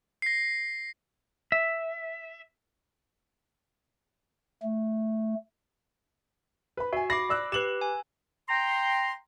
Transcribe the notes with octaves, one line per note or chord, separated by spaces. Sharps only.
A#6 C7
E5
A3
B4 B5
F#4 E5 G#5
B5 D6 A#6 C7
D5 E6 F#6
G4 B4 E7 F#7
G#5
G5 A#5 C6